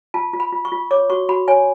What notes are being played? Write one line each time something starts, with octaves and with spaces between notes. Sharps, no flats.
F4 A5
F4
B5
F4
C#6
F4
C#5 D6
F#4 C#6
F#4 B5
C#5 G#5